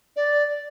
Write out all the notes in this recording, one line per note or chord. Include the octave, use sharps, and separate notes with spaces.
D5